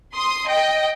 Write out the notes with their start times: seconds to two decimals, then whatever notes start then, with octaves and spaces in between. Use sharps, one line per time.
0.16 C6 D#6
0.48 D#5 G5